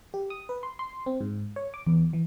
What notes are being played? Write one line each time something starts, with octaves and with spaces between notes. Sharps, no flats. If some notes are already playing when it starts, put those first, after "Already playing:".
G4
D#6
B4
C6
C6
C4
G#2
C#5
D6
E2
E3